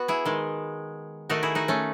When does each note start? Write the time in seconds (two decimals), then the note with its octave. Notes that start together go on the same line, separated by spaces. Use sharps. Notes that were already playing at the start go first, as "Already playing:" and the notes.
Already playing: B3 F#4
0.08 E4 G#4
0.25 D#3 G#3
1.29 D#3 A3 D#4 F#4
1.43 E4 G#4
1.55 D#4 F#4
1.68 A3 C#4